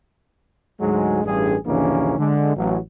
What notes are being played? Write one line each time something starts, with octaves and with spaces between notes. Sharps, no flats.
D2 G#2 F#3 G#3
A1 G2 G#4
A#1 D#2 D3 E3 A#3 C#4
D3 G#3
A1 F#3